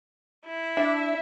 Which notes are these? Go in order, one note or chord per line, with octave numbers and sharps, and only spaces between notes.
E4
D4 E5